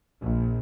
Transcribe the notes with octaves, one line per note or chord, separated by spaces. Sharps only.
A#1